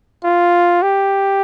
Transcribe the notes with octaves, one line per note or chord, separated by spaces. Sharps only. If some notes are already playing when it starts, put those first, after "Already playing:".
F4
G4